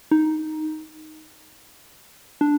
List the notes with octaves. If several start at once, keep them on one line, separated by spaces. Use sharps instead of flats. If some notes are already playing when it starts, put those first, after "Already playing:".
D#4
D4